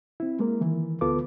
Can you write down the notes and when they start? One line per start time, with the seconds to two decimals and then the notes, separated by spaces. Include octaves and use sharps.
0.20 C4 E4
0.39 G#3 A#3 A#4
0.61 D#3 E3 E4
1.01 D2 B3 F4 A4 B4 D6